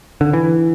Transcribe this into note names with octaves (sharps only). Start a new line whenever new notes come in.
D3
E3